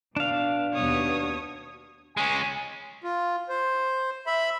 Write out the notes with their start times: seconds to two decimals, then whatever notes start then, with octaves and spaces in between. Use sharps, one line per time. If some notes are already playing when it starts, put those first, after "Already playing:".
0.16 B2 D4 F5
0.74 D#2 B2 C#5 D#6
2.17 G#3 C#4 G#5
3.04 F4
3.49 C5
4.27 E5 B5